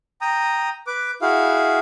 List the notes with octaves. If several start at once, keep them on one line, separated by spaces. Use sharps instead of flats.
G5 A#5 D#6
B4 D6
E4 F#4 G#4 F5